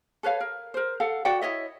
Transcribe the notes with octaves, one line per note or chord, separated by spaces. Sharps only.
A4 B4 C#5 F5
A#4
A#4 C5
A4 F5 F#5
F#4 D5 F#5 G5
E4 C#5 D#5 E5